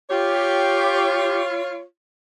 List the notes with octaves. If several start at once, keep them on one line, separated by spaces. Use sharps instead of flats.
F4 G4 C#5